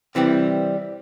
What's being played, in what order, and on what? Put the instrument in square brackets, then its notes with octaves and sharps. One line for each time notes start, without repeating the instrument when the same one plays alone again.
[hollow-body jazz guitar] C3 E3 G3 C4